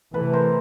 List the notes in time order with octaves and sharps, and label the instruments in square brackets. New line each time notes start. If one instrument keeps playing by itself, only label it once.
[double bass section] C3 E3 A3 [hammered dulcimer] A4 B4
[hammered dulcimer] A#4 C5